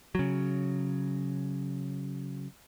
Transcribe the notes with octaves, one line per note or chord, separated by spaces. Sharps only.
C#3 F#3